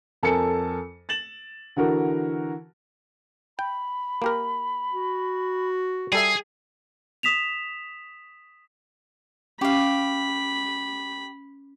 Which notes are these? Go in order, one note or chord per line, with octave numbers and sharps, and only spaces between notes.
F2 A4 A#4 G#5 A5 C#7
A6 E7 F#7
D3 E3 F#4 A#4
G5 B5
A#3 G4 A#4
F#4
G3 G#4 A4 E5 C7
D#6 B6 E7 F7
C#4 G4 F5 B5